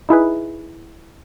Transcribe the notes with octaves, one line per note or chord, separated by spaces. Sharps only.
D#4 E4 G#4 B4